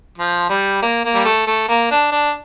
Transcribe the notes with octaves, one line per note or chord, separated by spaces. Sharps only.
F3
G3
A#3
A#3
G3
A3
A3
A#3
D4
D4